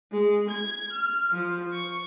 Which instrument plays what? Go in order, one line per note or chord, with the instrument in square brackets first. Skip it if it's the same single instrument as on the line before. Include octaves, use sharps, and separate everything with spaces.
[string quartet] G#3
G#6
F6
F3
C#6